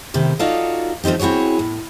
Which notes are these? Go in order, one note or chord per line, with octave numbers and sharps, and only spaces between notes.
A2 C3 D#3
D#4 F4 F#4 A4 D5 F5
F3 A3 C4 D#4 G4
C4 E4 F#4 G#4 C#5
A2